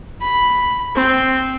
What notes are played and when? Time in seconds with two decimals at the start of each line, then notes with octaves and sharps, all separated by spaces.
0.22 B5
0.95 C4